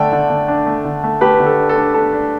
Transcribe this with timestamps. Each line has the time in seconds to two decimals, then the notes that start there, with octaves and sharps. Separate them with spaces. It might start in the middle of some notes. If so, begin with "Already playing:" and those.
Already playing: D3 A3 D5 G5
0.13 D3
0.30 D3
0.48 D4
0.66 A3
0.85 D3
1.04 A3
1.21 A3 G4 B4
1.40 D3
1.46 A4
1.58 D4
1.69 A4
1.76 D4
1.94 D4 A4
2.13 D4